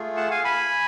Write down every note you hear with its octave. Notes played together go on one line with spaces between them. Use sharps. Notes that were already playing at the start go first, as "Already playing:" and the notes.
Already playing: A3 F4 G#4
F#5 A5
F5 G#5
G#5 B5